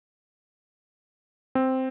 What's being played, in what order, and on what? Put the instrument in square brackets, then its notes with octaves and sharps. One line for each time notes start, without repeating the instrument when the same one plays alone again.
[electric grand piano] C4